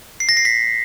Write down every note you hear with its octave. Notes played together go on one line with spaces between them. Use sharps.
C7
A#6
C7
B6